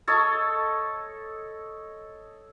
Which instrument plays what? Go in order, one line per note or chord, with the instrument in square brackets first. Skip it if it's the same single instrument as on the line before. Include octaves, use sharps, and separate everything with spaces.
[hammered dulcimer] A4 C#5 D#5